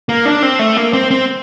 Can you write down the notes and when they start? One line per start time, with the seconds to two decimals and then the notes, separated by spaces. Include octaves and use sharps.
0.09 A#3
0.26 D4
0.43 C4
0.59 A3
0.77 A#3
0.93 C4
1.11 C4